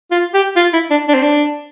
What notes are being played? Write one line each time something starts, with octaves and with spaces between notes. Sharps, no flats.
F4
G4
F4
E4
D4
D4
C4
D4